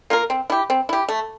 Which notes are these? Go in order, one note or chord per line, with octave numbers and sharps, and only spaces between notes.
A#3 F4 A#4
C4
E4 G4
C4
E4 G4
A3